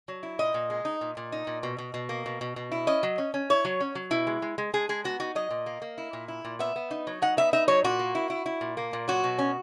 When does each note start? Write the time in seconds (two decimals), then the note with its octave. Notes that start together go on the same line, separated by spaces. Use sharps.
0.08 F#3
0.23 E4
0.39 A#2 D#5
0.54 A#2
0.70 G#3
0.85 D#4
1.01 A#2
1.17 A#2
1.32 D#4
1.47 A#2
1.63 B2
1.78 B2
1.94 B2
2.09 A#3
2.26 B2
2.41 B2
2.56 B2
2.72 E4
2.87 C#4 D#5
3.03 F#3
3.18 C#4
3.34 C#4
3.50 E4 C#5
3.65 F#3
3.80 C#4
3.95 F#3
4.11 B2 E4
4.27 G#3
4.42 G#3
4.58 G#3
4.74 G#3 G#4
4.89 G#3 G#4
5.04 B3 F#4
5.20 D#4 F#4
5.35 F#3 D#5
5.50 A#2
5.66 A#3
5.82 A#3
5.98 E4
6.13 A#2
6.28 E4
6.45 A#2
6.59 B3 E5
6.76 B3
6.91 D#4
7.07 F#3
7.22 D#4 F#5
7.37 B3 E5
7.53 D#4 E5
7.68 F#3 C#5
7.84 A#2 F#4
7.99 A#3
8.15 E4
8.30 E4
8.46 E4
8.61 A#2
8.77 A#3
8.93 A#2
9.08 F#3 F#4
9.24 B2
9.38 C#4